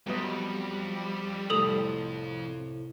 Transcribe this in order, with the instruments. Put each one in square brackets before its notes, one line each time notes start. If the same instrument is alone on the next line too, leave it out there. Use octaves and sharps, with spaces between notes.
[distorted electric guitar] F2 [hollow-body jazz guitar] F#3 B3 D#5 [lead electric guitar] G3
[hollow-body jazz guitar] C2 A2 [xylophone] A4 D#6 F7